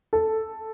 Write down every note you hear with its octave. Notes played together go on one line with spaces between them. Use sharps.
A4